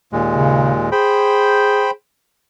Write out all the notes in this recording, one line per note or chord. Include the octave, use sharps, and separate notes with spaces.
D#2 A#2 G#3
C#3
G#4 C5 G5 B5